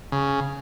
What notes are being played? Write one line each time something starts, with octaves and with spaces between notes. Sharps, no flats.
C#3